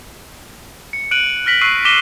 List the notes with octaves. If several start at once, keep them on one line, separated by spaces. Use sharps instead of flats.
C#7
F#6 D7 D#7 F#7
F6 A#6 B6 F#7
C#6 E6 F#6 C7 D#7
D6 A#6 B6 D#7 E7 G7